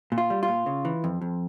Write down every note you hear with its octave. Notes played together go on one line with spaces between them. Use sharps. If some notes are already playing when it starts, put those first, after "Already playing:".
A#2
F4
G3
F4
A#2
C#3
E3
F2
F2